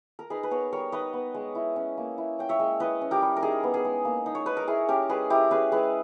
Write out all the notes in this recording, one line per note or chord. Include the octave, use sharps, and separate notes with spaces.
A#4
D#4 G#4 B4
B4
B3 A#4 C#5
G3 A#4 C#5
D#4 B4 D#5
B3
G#3
E4
C#4
A#3
E4
C#4 G5
C#5 E5
G#3
E4 B4 D#5
C#4
G4 A#4
G3
A#4
D#4 G#4
B3
G#4
G#3
A#3
D#4
C#5
D#4 B4
A#4
E4 G#4
C#4 G4 A#4
G#3 G#4 B4
E4 G4 A#4
C#4 G#4 B4
G#3 G#4 B4